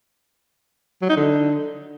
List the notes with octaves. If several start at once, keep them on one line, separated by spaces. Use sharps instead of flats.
F#3
D#4
D3